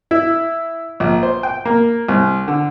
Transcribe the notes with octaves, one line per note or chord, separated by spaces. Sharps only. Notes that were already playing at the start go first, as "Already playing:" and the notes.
E4
A#1
C5
G5
A#3
C2
D3